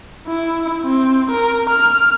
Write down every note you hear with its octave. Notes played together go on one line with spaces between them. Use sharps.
E4
C4
A#4
F6